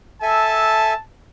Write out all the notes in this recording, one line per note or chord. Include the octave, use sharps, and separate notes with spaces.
A4 E5 G#5 A5